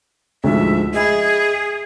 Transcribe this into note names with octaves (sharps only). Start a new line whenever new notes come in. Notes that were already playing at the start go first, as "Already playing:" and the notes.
D2 G#2 F3 E5
G#4 D#5 E5 B5